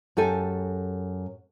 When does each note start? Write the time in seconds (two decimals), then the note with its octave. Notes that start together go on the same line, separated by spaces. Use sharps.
0.17 F#2 G4 A4 G#5